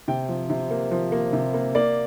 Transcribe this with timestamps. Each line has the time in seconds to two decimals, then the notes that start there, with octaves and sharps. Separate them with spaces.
0.08 C3 G5
0.29 F3
0.50 C3
0.71 A#3
0.91 F3
1.12 A#3
1.33 C3
1.54 A#3
1.75 A#3 D5